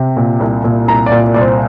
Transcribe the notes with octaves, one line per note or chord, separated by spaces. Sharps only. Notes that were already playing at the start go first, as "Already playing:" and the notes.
Already playing: C3
A#2
C2
A#2
C2 A#5
D5
A#2
D5
C2 D5
C5